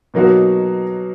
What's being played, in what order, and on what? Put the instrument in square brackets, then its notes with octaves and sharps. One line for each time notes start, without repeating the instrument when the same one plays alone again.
[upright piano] B2 F#3 A#3 D#4 F#4